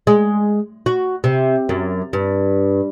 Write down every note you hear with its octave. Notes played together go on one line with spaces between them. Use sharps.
G#3
F#4
C3
F#2
G2